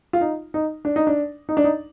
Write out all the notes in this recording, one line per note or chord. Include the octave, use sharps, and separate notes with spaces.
F4
D#4
D#4
D4
D#4
D4
D#4
D4
D#4